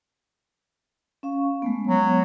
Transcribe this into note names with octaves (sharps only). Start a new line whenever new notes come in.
C#4 F5 C#6
G#3 A3 B3
F#3